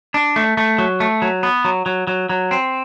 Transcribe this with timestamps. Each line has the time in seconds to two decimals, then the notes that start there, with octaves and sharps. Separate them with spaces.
0.14 D4
0.36 A3
0.57 A3
0.78 F#3
1.00 A3
1.22 F#3
1.43 B3
1.65 F#3
1.86 F#3
2.07 F#3
2.29 F#3
2.51 C4